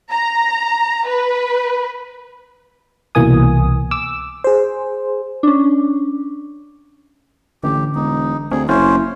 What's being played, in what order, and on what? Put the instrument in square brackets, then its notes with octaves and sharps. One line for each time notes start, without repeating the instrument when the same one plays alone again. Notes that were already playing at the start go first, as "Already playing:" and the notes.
[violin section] A#5
B4
[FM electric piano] C2 B2 E3 A#3 G#5 D#6
D6 E6
G#4 C5
[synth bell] C#4 D4
[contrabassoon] A1 [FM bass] D3 [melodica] G4
[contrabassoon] E1 [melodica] D#4
[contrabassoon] D2 [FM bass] C4 [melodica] G#4
[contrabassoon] F#1 [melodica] C#4 C5 [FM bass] E4